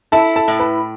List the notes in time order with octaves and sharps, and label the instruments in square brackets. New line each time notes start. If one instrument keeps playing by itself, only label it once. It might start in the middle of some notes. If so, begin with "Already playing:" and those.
[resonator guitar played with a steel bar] E4 [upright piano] A4 A5
[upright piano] A4 A5
[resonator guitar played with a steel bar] A2
[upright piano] B4 B5